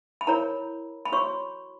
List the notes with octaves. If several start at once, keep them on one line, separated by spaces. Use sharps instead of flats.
B5
E4 A#4 C#5 A#5
B5
F#4 C#5 C#6